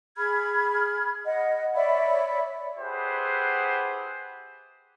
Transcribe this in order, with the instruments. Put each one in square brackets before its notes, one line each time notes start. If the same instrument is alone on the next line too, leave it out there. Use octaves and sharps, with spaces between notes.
[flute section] G#4 B5 F6 G#6
D#5 F#5
C#5 D5 E5 B5
[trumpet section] E4 G4 G#4 B4 C5 F#5